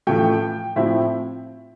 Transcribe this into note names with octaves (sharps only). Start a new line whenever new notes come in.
A1 A2 F3 A3 G5
A2 F3 C4 E4 E5